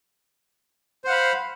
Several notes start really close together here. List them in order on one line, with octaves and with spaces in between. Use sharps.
C5 F#5 F5 B5